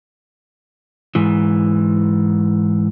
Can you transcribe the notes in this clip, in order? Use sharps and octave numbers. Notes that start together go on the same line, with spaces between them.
G#2 E3